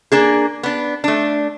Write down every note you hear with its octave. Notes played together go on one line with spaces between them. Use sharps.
A#3 D4 G#4
B3 D4
A3 D4